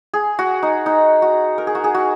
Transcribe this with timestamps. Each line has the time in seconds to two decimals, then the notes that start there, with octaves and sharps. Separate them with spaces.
0.14 G#4
0.39 F#4
0.63 D#4
0.86 D#4
1.22 F#4
1.58 A#4
1.67 G#4
1.75 F#4
1.84 G#4
1.95 F#4